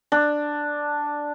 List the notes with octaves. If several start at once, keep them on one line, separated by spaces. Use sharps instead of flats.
D4